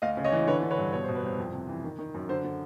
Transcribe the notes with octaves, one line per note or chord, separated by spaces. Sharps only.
D2 D#5 F5
C#3
C#5 D#5
E3
D3 B4 C#5
D3
B4 C#5
G2
B2 C#5
B2 C5
B4
C2 C5
F2
C3
E3
D#3
D#3
F#2
D3 C5
D3